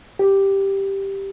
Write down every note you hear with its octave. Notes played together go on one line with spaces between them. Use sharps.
G4